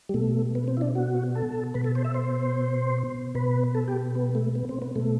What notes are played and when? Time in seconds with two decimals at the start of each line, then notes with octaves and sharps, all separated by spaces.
0.09 G3
0.14 B2 A3
0.55 B3
0.68 C4
0.77 E4
0.81 D4
0.95 F#4
1.35 A4
1.74 B2 B4
1.84 A4
1.95 C5
2.05 E5
2.14 C5
3.35 B2 B4
3.75 A4
3.88 G4
4.15 B3
4.35 A3
4.55 B3
4.69 C4
4.82 B3
4.96 B2 A3